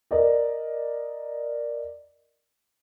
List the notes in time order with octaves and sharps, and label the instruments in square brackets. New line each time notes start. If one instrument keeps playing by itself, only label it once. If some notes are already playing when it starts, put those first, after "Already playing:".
[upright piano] A#4 D5 D#5